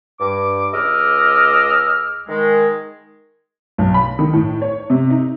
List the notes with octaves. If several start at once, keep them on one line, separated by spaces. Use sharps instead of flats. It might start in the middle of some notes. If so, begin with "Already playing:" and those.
G2 D6
C#2 D#5 D6 E6 F6
D#3 G#3
B1
B5
D#3
A2
C#5
C3
D#4